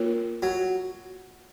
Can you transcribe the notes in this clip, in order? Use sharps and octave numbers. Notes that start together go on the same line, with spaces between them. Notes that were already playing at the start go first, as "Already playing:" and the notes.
Already playing: A#3 F4 A#4 C#5
F#3